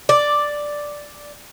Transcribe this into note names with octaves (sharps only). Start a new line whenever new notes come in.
D5